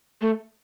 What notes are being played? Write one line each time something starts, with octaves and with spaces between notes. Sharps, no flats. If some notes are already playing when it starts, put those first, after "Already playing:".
A3